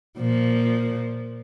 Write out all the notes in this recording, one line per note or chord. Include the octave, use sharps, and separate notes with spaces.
A#2 F3